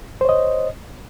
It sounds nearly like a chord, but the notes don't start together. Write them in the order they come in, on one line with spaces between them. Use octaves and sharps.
C5 C#5 D#5